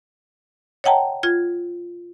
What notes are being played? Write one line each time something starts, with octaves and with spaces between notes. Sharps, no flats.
C#5 D#5 F#5 G5 A5 A#5
F4 G#6